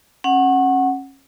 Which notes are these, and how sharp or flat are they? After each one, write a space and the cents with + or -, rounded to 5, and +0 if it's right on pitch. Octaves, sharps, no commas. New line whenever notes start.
C#4 -30 F#5 +0